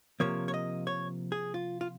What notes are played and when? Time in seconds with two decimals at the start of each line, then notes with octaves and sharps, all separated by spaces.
0.20 C3 F3 A#3 C#5
0.48 C#5
0.54 D#5
0.87 C#5
1.32 G#4
1.54 F4
1.81 F4